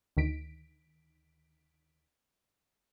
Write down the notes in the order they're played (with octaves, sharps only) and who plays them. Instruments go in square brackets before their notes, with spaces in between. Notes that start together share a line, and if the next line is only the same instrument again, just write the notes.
[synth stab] D2 D#3 B6 D7